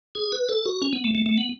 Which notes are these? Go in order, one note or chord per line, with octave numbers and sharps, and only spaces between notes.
G#4
B4
A4
F#4
C#4
B3
A3
A3
A3
B3